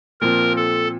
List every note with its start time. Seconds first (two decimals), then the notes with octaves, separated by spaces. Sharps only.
0.21 A#2 F3 C4 A#4
0.56 A4